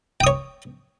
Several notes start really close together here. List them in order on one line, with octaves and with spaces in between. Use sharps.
G5 D#6 C#5